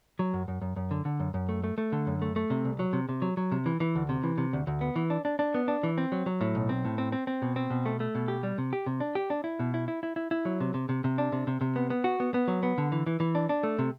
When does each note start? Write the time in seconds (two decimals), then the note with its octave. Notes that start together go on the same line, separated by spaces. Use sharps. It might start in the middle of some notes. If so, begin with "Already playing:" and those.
0.19 F#3
0.34 F#2
0.48 F#2
0.61 F#2
0.76 F#2
0.91 D3
1.05 D3
1.20 F#2
1.34 F#2
1.49 A3
1.64 A3
1.78 A3
1.92 D3
2.07 F#2
2.22 A3
2.36 A3
2.50 C3
2.65 C2
2.79 F#3
2.93 C3
3.09 C3
3.22 F#3
3.37 F#3
3.52 C3
3.66 E3
3.80 E3
3.95 D2
4.09 C3
4.23 E3
4.38 C3
4.53 D2
4.67 D2
4.81 B3
4.96 E3
5.10 D4
5.25 D4
5.39 D4
5.54 B3
5.68 D4
5.83 E3
5.98 C4
6.12 F#3
6.26 F#3
6.41 A2
6.55 B1
6.69 C4
6.85 A2
6.98 C4
7.12 C4
7.27 C4
7.42 B2
7.56 C4
7.70 B2
7.86 A3
8.00 A3
8.15 B2
8.28 G4
8.43 G3
8.58 C3
8.73 G4
8.86 C3
9.00 D4
9.15 G4
9.30 D4
9.44 E4
9.60 B2
9.74 E4
9.88 E4
10.03 E4
10.16 E4
10.31 E4
10.45 F#3
10.60 C3
10.74 C3
10.89 C3
11.04 C3
11.18 D4
11.32 C3
11.47 C3
11.61 C3
11.76 B3
11.90 B3
12.04 F#4
12.20 B3
12.34 B3
12.48 F#3
12.63 B3
12.78 D3
12.92 E3
13.06 E3
13.20 E3
13.35 D4
13.49 D4
13.63 A3
13.79 C3